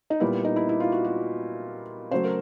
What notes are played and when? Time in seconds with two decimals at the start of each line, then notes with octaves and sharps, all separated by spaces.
0.10 D#4
0.20 A#2 G3 B3 E4
0.45 D#4
0.56 E4
0.69 E4
0.80 F4
0.92 F#4
1.04 F#4
2.11 C#3 F#3 A3 C5
2.24 A#4